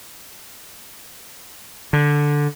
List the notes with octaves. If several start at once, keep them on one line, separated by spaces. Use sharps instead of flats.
D3